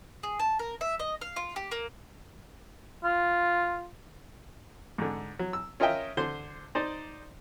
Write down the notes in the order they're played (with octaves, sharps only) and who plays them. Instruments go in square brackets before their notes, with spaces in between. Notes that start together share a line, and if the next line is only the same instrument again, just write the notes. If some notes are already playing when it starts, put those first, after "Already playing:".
[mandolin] G#4
A5
A#4
E5
D#5
F5
F4
G4
A#3
[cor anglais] F4
[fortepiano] G#2 D3
F#3
E6
C#4 F4 A#4 D#5 E5 G5
D3 C5 C6
D#4 C5 D5